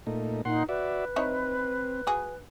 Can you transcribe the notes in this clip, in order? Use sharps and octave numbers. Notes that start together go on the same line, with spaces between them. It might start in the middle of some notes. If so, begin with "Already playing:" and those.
A#2 A3 D#4
A#2 D#4 F#5 C6
F#4 B4 D5 E5
C4 D#4 E4 C#5
F#4 G#4